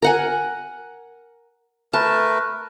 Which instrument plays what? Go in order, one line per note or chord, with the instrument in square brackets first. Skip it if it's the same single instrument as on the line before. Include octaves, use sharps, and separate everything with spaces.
[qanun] A#4 F#5 G#5
[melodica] A3 A#4 B4 [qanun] A5